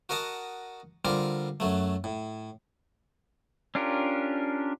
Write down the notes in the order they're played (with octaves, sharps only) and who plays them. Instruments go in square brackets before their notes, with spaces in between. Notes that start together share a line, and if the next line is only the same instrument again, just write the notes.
[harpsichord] F#4 A#4 D#5 F#5 A5
D3 G3 C4 F4 A#4
F#2 F#3 A3
A2
[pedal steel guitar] C#4 D4 F4 G4 A#4